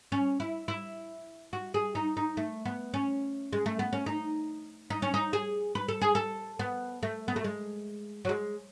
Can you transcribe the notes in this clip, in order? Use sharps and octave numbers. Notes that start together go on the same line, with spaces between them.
C#4
E4
E4
F#4
G#4
D#4
D#4
A3
B3
C#4
G#3
A3
B3
C#4
D#4
D#4
C#4
D#4
G#4
B4
A4
G#4
A4
B3
A3
B3
A3
G#3
F#3
G#3